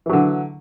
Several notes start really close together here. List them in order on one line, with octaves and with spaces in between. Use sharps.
E3 F#3 D3